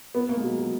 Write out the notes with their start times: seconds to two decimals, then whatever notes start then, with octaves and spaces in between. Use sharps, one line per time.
0.15 B3
0.29 A#3
0.37 G#3
0.43 F#3
0.59 F#3